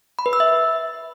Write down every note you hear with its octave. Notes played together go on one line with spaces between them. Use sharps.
B5
B4
E6
E5